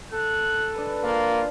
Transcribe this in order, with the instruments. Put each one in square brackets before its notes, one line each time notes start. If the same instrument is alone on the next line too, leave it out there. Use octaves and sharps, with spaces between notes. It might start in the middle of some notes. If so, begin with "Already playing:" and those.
[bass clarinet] A4 [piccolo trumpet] F#6
[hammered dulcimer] D4 B4
[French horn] A#3 [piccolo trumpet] F4